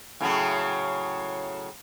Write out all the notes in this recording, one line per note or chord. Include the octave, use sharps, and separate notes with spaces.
A2 C#3 F#3